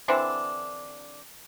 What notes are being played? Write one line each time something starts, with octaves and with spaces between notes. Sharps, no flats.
D3 E3 C4 D4